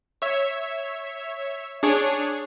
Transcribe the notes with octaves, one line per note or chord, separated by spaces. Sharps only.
C#5 E5
D4 G#4 C#5